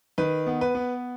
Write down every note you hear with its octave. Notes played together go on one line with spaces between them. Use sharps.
D#3 B4
B3
B4
B3